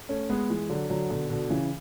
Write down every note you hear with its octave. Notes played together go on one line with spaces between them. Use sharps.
A3 C#4
G#3 B3
E3 G#3
D3 F#3
D3 F#3
B2 D3
B2 D3
C#3 E3